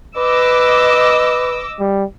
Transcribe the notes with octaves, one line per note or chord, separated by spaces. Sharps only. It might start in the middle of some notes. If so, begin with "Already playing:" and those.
B4 D#5 D6 E6
G3